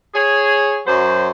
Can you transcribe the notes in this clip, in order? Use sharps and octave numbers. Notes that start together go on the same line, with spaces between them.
G#4 C#5
F#2 F#3 C5